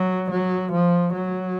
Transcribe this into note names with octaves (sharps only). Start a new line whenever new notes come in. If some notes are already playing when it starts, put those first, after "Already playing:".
Already playing: F#3
F#3
F3
F#3